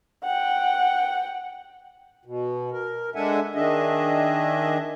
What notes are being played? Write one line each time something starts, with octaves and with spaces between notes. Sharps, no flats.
F#5 G5
B2
A#4
G#3 D4 A4 E5 F#5 G#5
D#3 D4 G#4 D#5 E5